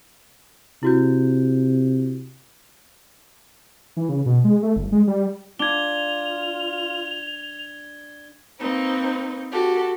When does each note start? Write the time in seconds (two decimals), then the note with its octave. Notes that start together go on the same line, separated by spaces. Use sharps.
0.83 C3 E4 F#4 G6
3.97 E3
4.09 C#3
4.26 B2
4.44 G#3
4.63 A3
4.76 G1
4.92 G#3
5.07 G3
5.59 D4 F4 G#6 F7 G7
8.59 A#3 C4 D#4 B4
9.52 F#4 G4 A4